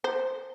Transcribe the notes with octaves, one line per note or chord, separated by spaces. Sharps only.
C5